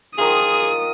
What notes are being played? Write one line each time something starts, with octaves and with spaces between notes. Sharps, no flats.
D#3 F3 F4 G#4 D#6